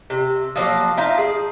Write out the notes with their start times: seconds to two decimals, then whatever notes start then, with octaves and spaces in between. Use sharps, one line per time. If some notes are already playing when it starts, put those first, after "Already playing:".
0.10 C3
0.56 F3 F#3 A#3
0.97 D#4 F4 E5
1.18 G#4